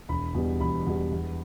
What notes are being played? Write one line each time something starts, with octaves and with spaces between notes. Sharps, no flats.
E1 B5
E2 B2 G3
E1 B5
E2 B2 G3
E2